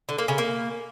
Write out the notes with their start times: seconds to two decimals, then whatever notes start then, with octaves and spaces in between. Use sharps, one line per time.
0.09 D3
0.18 A#3
0.28 C#3
0.38 A#3